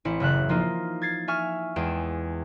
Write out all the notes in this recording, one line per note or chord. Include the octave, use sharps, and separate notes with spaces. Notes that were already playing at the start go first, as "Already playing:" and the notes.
A1 C4 E4 C#7
F#1 C#3 E5 F#6
F3 A#3 D#4 F4
G#6 A6 C7
E5 G#5 C#6 F6
E2 G#3 G5 E7